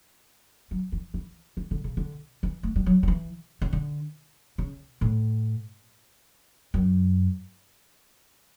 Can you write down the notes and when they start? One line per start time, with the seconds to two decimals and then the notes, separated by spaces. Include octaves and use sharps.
0.71 F#3
0.92 E3
1.14 E3
1.57 E3
1.71 D3
1.84 C#3
1.97 D3
2.43 E3
2.63 A3
2.76 G3
2.86 F#3
3.03 F#3
3.08 E3
3.62 C#3
3.73 D3
4.58 C#3
5.01 A2
6.74 F#2